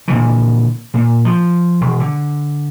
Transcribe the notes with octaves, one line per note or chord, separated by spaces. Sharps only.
A#2 D3 E3
A#2
F3
E1
D3